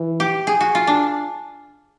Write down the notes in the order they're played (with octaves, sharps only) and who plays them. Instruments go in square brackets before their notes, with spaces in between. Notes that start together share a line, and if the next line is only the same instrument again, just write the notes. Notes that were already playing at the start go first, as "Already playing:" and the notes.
Already playing: [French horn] E3
[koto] G4
G#4
F#4
F4
D4